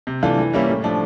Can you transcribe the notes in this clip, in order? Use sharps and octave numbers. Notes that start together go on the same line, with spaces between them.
C3
E3 A3 D4 F4
E3
G3 A#3 C#4 E4
A2
F3 A3 D4